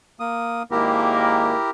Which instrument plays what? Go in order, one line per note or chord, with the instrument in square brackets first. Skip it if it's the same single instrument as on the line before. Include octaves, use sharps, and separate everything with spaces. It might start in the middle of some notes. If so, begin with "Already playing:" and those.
[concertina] A#3 D#6
[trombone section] G#1 G#3 A#3 [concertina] E4 G4 A#4